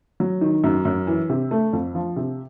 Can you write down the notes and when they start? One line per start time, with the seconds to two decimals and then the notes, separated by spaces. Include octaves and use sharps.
0.20 F#3
0.41 D#3
0.64 F#2
0.85 F#2
1.07 E3
1.30 C3
1.51 A3
1.73 F2
1.95 F3
2.16 C3